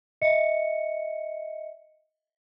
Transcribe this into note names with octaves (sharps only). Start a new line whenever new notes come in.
D#5 E5 C#7